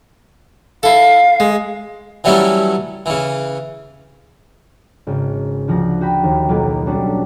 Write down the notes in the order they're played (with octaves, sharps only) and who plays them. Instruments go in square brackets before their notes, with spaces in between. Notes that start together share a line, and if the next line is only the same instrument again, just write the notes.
[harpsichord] E4 A4 [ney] F5
[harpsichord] G#3
E3 F#3 G3 A3 C#4 E4
C#3 E3
[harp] G#1 C#3
D2 F3 F#5 A#6
F#4 G5 A#5 B5
D#2
B1 F#3 A#3 B3 F4
G3 C#4 D4 F#4 A4